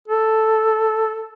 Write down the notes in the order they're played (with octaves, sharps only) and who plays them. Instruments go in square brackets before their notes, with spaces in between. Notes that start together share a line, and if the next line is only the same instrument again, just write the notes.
[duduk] A4